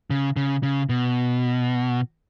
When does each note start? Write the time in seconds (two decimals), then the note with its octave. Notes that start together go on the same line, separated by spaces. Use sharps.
0.10 C#3
0.37 C#3
0.63 C#3
0.89 B2